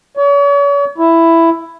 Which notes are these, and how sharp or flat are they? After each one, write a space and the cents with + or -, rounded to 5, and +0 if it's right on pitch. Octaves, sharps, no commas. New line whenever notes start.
C#5 +40
E4 +5